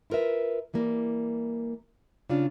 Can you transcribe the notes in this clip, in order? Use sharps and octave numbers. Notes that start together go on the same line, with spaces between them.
E4 F4 A#4 B4 E5
E3 G3 A#3
C#3 D4 F4